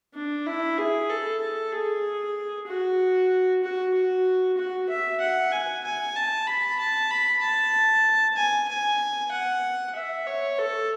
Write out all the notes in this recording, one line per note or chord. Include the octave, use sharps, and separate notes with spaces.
D4
E4
G#4
A4
A4
G#4
F#4
F#4
F#4
F#4
E5
F#5
G#5
G#5
A5
B5
A5
B5
A5
G#5
G#5
F#5
E5
C#5
A4